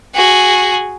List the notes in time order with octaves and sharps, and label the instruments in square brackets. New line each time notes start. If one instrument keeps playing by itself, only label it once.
[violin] F#4 G#4